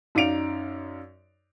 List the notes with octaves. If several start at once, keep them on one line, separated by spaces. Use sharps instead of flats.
F#2 D#4 D5 F5 D7 F7